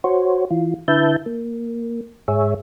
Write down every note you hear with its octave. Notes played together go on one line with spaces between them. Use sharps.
F#4 C5 C#5
E3 F4
D3 E4 B4 E5 A5 G6
A#3
G#2 G#4 C#5 E5